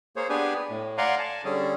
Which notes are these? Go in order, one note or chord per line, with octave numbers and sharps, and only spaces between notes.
A#3 G#4 C5 C#5
B3 D4 G4 G#4 B4 G#5
A2
D5 F5 F#5 G#5 A#5 C6
G#5 A5
D3 G3 C#4 G#4